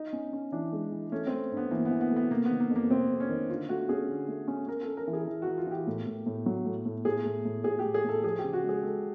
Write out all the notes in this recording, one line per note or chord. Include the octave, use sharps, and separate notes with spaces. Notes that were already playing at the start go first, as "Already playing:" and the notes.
Already playing: D#4
C#4
C#4
E3 D4
G#3
E3
A3 C#4
C4
A3
G2
B3
E3 A#3
B3
E3
B3
A3
B3
C3 A#3
B3
D#3
A#3
F2
A#3
C3 C4
F2
C#4
D#3
D3 F4
A3 F#4
C#4 G#4
D3
A3
C#4
C#4 A#4
A4
C#4
A#4
E3
G#4
E3
E3 F#4
F4
E3 G4
A2
A2
A2
F#3
A2
A2
A2 G#4
A2
A2
A2 G#4
G4
A2
G#4
A2 A4
F3 G#4
G4
C#3
F#4
G#3 G#4
G#3 A4